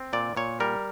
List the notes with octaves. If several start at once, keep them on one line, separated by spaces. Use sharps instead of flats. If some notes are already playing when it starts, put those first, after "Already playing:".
Already playing: C4
A#2 D5
A#2 C#5
G3 A#4